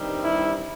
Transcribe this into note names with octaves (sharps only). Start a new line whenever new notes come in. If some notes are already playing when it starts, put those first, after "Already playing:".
Already playing: G2 D#3 G3 C4 D#4
E4